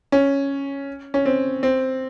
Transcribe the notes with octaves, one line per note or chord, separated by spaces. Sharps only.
C#4
C#4
C4
C4